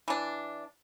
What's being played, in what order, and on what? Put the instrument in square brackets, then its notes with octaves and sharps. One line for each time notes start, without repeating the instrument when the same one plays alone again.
[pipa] E3 D4